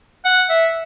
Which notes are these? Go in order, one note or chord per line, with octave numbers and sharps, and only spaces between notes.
F#5
E5